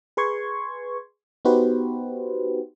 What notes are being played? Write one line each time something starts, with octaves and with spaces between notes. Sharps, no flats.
G#4 B4 C6 C#6 G#6
B3 D#4 F#4 G4 B4 C5